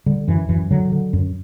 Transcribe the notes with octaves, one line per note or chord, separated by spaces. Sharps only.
D3 G3
F#2 E3
F#2 E3
D3 F#3
D3
F#2